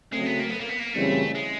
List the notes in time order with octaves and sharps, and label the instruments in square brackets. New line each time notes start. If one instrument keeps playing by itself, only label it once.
[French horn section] C#3 F#3 A3 C4 [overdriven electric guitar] G#3
[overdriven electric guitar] B3
A#3
B3
A#3
B3
A#3
[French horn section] F#2 C#3 E3 G3 C4 [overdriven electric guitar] A3
[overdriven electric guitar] G#3